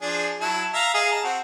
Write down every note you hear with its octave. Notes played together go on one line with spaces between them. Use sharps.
F3 D4 G#4
F#3 E4 A5
E5 F5 A#5
G#4 D#5 F5
A5 A#5
C4 F#4